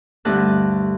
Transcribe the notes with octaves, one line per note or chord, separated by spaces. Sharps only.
D2 G2 A3 A5 F#6